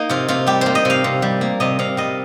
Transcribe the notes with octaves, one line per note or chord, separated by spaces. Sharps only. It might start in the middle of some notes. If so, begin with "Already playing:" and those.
Already playing: A#3 D#4
C3 F4
C3 F4
G3 G4
A#3 C5
D#5
C3 F5
C3
G3
A#3
C3 D#5
C3 F5
G3 D#5